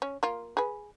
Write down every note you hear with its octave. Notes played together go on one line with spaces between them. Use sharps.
C#4
A#3 F4
G#4 B4